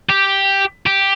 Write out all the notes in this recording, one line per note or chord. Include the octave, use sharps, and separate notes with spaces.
G4
G4